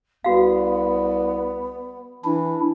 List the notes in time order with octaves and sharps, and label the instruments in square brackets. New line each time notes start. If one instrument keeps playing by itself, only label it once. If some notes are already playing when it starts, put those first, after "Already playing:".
[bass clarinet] C2 [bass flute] B3 [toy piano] F#4 F5
[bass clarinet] E3 [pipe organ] D4 E4